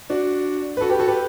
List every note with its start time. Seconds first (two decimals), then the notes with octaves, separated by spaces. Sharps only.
0.10 D4 F#4
0.77 B4
0.81 F#4 A4
0.90 G4 B4
0.99 F#4 A4
1.08 G4 B4